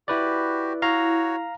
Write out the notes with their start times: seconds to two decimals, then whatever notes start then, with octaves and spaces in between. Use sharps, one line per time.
0.08 E4 F#4 G4 B4 D5
0.82 E4 F#4 C#5 F5 A#5